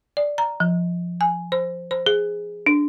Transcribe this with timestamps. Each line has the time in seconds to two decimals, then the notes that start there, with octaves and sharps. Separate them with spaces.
0.17 D5
0.38 A#5
0.60 F3
1.21 G#5
1.52 C5
1.91 C5
2.06 G#4
2.66 D4